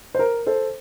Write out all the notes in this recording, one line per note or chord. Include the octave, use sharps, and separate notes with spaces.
C5
A#4
A4 C5